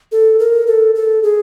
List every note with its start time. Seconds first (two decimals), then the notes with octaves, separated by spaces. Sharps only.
0.12 A4
0.39 A#4
0.67 A4
0.95 A4
1.23 G#4